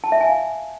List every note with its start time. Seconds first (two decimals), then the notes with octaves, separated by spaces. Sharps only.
0.04 A5
0.12 E5
0.21 G#5
0.29 F5